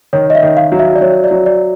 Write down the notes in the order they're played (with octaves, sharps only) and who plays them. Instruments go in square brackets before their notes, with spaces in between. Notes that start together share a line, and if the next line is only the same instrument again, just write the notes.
[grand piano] D#3 [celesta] C#5
[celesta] D#5
E5
[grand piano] D#3
[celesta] F5
[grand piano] F#3
[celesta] E5
D5
[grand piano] F#3 [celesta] C#5
[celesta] D5
[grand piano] F#3
[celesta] D5